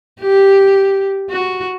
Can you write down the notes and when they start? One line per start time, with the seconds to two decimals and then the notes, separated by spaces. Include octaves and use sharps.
0.21 G4
1.30 F#4